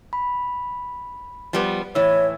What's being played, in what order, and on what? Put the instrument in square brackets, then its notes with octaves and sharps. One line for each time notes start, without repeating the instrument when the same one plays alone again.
[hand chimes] B5
[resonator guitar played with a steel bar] F3 G3 B3
[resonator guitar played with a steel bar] A2 E3 [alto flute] C#5 [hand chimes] E6